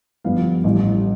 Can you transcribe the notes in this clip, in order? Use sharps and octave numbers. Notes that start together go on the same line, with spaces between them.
G1 G2 F3 B3 F5
A1 G2 E3